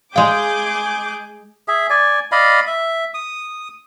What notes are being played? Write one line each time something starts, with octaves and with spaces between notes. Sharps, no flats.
G#3 G#4 F5 G5 D6 G6
G#4 E5
D5 G#5
D5 D#5 F5 B5
E5
D#6